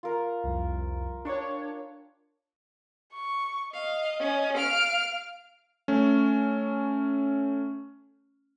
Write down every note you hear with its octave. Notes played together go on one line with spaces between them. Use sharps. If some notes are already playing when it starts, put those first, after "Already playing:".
F4 A#4
C2 F2
D4 C#5 G5 C#6 D6
C#6
D#5 F5
C#4
F5 F6 D7
A3 C#4